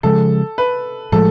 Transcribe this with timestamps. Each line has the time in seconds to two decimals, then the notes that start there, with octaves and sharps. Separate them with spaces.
0.03 C#3 F3 G#3 A4
0.58 B4
1.12 A2 F3 G#3 A4